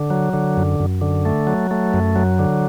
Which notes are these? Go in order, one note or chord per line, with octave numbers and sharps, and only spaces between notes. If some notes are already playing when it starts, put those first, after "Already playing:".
Already playing: D3
F#3
D3
F#2
F#2
D3
A3
F#3
A3
F#2
F#3
D3